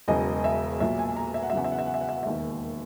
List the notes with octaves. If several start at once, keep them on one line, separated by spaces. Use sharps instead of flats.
E1 E2 C#3 F#3 D#5
E5
B1 A#2 F#3 E5
G#5
A#5
E5
F#5
E5
E2 C#3 F#3 F#5
E5
F#5
E5
F#5
E5
F#5
E5
F#5
E1 D#2 D#3 E5